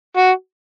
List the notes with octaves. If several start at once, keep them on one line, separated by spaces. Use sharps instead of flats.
F#4